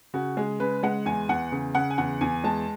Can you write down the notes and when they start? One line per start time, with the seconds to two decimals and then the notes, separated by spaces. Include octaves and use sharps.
0.14 C#3 F#4
0.37 G#3 G#4
0.60 C#3 B4
0.83 G#3 F#5
1.06 E2 G#5
1.29 E2 F#5
1.52 C#3
1.75 C#3 F#5
1.90 G#5
1.98 E2 F#5
2.21 E2 G#5
2.44 G#3 A5